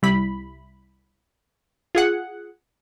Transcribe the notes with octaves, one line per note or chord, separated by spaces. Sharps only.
C2 G3 E4 B5
F4 G#4 F#5